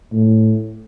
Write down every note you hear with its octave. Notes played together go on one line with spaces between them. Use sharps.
A2